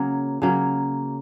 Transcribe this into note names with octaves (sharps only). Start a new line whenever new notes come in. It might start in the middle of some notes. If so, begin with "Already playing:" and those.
Already playing: C#3 F#3 A#3
C#3 F#3 A#3